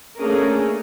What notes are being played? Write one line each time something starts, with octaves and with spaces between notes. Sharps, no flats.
A3 A#3 C#4 D4 G#4 A#4